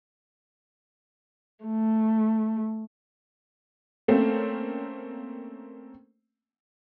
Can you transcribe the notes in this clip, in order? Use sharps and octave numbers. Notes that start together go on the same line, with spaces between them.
A3
A3 A#3 C4 C#4